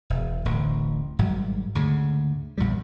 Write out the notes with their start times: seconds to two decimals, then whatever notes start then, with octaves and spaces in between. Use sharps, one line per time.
0.10 E1 E2
0.45 D1 A1 D2
1.19 G#1 G#2 F#3 G3
1.75 D2 G#2 C#3
2.58 A#1 E2 A#2 G3